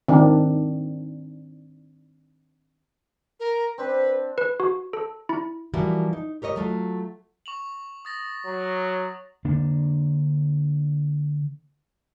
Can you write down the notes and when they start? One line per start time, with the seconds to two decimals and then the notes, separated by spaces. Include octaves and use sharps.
0.08 D#3 C4 D4
3.40 A#4
3.78 C4 D4 B4 C5
4.38 B4
4.60 F#4
4.93 A4
5.29 E4
5.74 E3 F3 G3 A#3 E4 F#4
6.13 D#4
6.42 G4 A#4 C#5 D#5
6.56 F#3 A3 F4
7.46 C#6 F7 F#7
8.05 D#6 A6 A#6
8.45 F#3
9.45 D3 A#3 D4